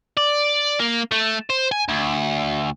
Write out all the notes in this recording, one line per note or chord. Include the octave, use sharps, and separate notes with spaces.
D5
A#3
A3
C5
G#5
D2